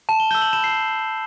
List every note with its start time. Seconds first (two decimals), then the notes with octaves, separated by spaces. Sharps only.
0.09 A5 E7
0.20 G7
0.31 E6 G6 G7
0.42 F#7
0.53 B5 E7
0.64 C7